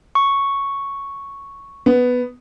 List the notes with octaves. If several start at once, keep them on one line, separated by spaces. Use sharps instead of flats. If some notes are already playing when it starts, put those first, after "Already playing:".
C#6
B3